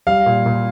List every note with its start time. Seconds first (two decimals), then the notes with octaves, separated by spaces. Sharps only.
0.07 G3 F5
0.26 A#2
0.46 A#2